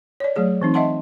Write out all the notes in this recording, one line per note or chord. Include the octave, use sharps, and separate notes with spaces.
C#5 D5
F#3 A3 G#4 C#5
E3 C4 D#4
D#5 E5 F#5 A5 C6